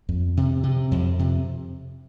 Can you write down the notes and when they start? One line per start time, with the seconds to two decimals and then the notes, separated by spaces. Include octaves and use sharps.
0.09 F2
0.37 C3
0.63 C3
0.91 F2
1.19 C3